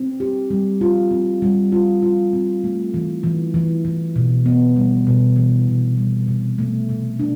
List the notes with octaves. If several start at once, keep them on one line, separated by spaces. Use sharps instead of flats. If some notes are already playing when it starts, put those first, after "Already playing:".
Already playing: C4
G4
G3
F4
C4
G3
F4
F4
C4
A3
E3
E3
E3
E3
B2
B3
G3
B2
E3
C3
G3
C3
A3
C3
D4